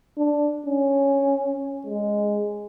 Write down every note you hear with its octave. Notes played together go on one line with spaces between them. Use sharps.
D4
C#4
G#3